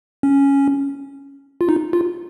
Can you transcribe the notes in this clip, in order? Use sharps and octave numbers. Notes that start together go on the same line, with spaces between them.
C#4
F4
D#4
F4